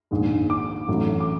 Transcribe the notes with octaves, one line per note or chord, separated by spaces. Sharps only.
A#1 G#2 D#3 G#3
D6
A1 A2 F#3 A3
D6